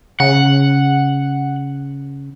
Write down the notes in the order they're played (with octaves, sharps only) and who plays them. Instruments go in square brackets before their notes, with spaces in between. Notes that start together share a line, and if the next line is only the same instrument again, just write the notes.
[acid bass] C#3 [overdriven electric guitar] F#5